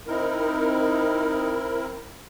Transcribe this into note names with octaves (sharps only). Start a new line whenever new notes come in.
C4 D#4 E4 A#4